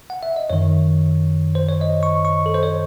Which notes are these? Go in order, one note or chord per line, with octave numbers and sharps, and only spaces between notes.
F#5
E5
D#5
F#2 D#3 C#5
C5
C#5
D#5
C#6
C#6
A4
C5
C#5